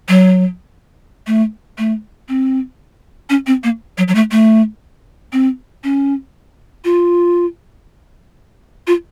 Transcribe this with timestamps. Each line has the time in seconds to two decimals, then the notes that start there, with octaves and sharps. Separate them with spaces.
0.09 F#3
1.27 A3
1.78 A3
2.29 C4
3.30 C#4
3.47 C4
3.64 A#3
3.98 F#3
4.08 F#3
4.15 A3
4.31 A3
5.33 C4
5.84 C#4
6.85 F4
8.87 F4